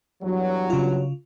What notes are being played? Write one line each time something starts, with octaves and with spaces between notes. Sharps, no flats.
E2 G2 F#3
C#3 F4